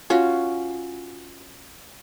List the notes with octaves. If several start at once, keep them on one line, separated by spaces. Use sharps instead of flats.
C#4 F4 F#4